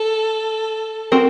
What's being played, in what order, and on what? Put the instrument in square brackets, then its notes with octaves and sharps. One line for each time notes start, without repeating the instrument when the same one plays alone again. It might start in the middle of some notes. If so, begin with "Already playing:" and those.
Already playing: [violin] A4
[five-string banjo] C4 F#4 A#4